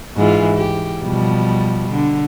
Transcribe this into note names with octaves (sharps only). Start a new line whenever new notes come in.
G#2 E3 F4
G4
B2 F3 G3
D3